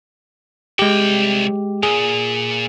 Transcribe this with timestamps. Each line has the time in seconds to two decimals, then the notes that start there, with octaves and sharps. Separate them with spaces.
0.79 C2 G#3 G4 G5
1.83 A#2 G#4